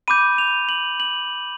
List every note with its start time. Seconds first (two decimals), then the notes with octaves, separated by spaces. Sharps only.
0.08 B5 D6 G6 D#7
0.38 F7
0.69 F#7
1.00 F#7